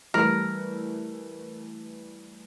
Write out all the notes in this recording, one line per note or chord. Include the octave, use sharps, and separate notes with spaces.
E3 G3 A3 A#4